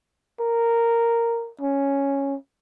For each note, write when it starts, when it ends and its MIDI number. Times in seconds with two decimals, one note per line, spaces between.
0.40 1.51 70
1.61 2.36 61